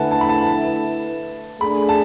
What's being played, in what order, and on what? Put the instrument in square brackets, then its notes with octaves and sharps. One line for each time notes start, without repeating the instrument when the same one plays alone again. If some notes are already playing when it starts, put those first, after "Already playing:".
Already playing: [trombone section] D3 A3 E4 B4 [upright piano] F#5 G#5 A5
[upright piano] A5
B5
A5
[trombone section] A3 D4 G#4 [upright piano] B5
[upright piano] A5